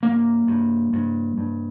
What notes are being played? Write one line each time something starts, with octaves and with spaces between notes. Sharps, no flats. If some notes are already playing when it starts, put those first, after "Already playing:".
G2 A#3
G2
G2
G2